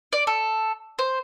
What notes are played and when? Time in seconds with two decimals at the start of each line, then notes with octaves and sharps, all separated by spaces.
0.13 D5
0.27 A4
0.99 C5